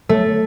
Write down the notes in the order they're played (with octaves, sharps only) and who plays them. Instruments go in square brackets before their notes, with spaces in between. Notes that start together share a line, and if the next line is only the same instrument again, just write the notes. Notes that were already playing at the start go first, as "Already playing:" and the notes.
[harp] A3